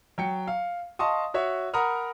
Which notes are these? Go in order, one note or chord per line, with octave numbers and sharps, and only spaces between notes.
F#3 G5 C#7
F5
D#5 F5 A5 C6 C#6 D#6
F#4 C#5 E5
A#4 F#5 A#5 B5 D#6 F6